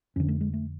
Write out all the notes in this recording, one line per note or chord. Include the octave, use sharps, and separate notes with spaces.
F2 D3 C#4
A3
G#3
A3